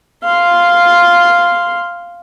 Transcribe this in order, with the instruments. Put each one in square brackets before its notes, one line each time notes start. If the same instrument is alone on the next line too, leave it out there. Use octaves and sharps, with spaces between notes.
[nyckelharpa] F5 C6